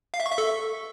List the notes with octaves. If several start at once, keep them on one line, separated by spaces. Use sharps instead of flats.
F5
E5
C#6
E5
A4